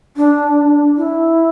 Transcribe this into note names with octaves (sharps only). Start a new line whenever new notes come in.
D4
E4